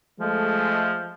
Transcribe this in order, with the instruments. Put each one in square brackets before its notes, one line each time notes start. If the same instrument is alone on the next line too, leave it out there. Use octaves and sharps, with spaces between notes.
[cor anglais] F3 [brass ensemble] G#3 A3